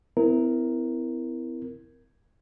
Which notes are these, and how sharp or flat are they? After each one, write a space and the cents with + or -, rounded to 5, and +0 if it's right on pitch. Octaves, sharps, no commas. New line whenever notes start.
C4 -45 E4 +0 A#4 +0